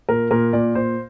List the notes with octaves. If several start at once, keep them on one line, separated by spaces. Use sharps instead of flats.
A#2 A#4
A#2 A#4
A#2 D5
A#2 C5